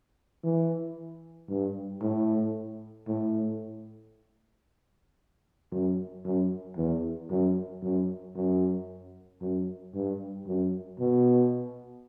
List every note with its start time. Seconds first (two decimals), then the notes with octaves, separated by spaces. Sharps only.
0.43 E3
1.49 G2
2.02 A2
3.08 A2
5.72 F#2
6.24 F#2
6.77 E2
7.30 F#2
7.82 F#2
8.36 F#2
9.41 F#2
9.94 G2
10.47 F#2
10.99 B2